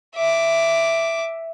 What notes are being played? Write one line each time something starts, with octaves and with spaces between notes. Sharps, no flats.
E5 D6